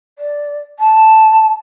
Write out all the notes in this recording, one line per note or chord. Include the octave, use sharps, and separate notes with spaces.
D5
A5